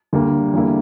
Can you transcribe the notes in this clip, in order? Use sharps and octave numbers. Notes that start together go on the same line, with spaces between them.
D2 D3 G3 A#3
E2 D3 G3 A#3 E4